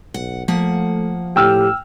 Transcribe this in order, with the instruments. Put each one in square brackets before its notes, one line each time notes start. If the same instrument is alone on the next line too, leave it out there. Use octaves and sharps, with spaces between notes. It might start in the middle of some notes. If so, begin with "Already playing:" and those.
[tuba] B1 [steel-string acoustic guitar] F#5
[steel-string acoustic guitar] F3 A#3 F#5 [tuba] A3
[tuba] A2 [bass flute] G4 [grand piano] G5 E6 F6